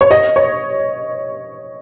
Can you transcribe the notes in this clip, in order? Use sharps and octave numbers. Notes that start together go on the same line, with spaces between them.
C#5
D#5
C#5